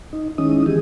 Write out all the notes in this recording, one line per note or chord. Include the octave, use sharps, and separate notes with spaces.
D#4
D#3 G#3 C#4 D#4 E4 D#6
D#3 E3 G4 G#4